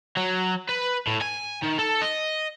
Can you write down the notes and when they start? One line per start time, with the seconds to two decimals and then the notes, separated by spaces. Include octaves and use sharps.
0.17 F#3
0.69 B4
1.07 A2
1.21 G#5
1.62 D#3
1.78 A4
2.01 D#5